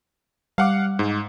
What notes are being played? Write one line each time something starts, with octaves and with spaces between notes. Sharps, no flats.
G3 F5 F#5 D6
G#2